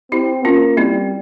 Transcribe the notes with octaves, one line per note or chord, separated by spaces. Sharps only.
C4 E4 G4
A#3 C#4 F4
G3 C4 E4